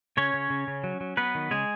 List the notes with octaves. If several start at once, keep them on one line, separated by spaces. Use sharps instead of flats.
C#3 C#4 C#5
C#3
C#3
C#3
F#3
F#3
F#3 B3 B4
D#3
C#3 G#3 G#4